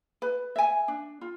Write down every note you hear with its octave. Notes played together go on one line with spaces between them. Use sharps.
B4
E5 G#5
D4
F4